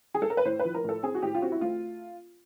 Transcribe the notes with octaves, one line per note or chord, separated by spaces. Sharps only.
G#4
A4
A#4
B4
A2 C5
B4
F3
A#4
A2 A4
C4 G#4
F#4
A2 G4
F4
C4 F#4
E4
A3 F4